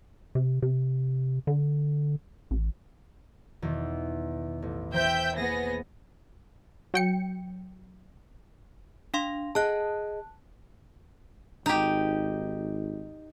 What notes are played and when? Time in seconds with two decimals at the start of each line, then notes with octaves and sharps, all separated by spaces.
0.35 C3
0.62 C3
1.47 D3
2.51 A1
3.62 E2 B2 D#3
4.62 A1
4.93 E3 C5 E5 G5 A#5 G6
5.37 A#3 B3 G#4 A#6
6.94 F#3 G5 C#7
9.14 D4 F5 C6
9.55 G#4 D#5 F#5 A5 F#6
11.66 G#1 D#4 G4